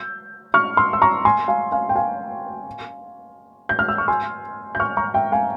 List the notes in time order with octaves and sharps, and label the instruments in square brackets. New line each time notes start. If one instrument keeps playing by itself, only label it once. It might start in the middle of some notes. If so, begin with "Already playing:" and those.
Already playing: [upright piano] E6 G6
C#6 F6
C6 E6
E6
A#5 C#6
G#5 C6
F5 G#5
F5 G#5
G5
F5 G#5
G6
F6
E6
C#6
G#5 C6
G6
C#6 F6
A#5 C#6
E5 G5
F5 G#5